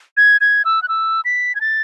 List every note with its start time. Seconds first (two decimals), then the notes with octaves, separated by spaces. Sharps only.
0.17 G#6
0.41 G#6
0.65 E6
0.83 F#6
0.88 E6
1.25 B6
1.55 G#6
1.61 A6